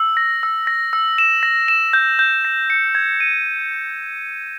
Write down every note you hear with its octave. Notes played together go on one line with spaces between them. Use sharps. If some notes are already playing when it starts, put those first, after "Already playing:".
Already playing: E6
A#6
E6
A#6
E6
E7
A#6
E7
G6
G6
A#6
C#7
G#6
D#7